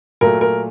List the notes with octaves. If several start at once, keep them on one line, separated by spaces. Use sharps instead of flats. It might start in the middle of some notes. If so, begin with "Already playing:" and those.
A#2 F#3 A3 A#4
A#4